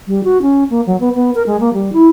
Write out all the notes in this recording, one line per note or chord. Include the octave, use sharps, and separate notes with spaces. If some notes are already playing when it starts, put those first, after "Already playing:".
G3
F#4
C#4
A#3
F#3
B3
B3
A#4
G#3
A#3
G3
E4